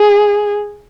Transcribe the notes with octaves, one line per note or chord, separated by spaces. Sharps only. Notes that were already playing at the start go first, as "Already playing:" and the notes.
Already playing: G#4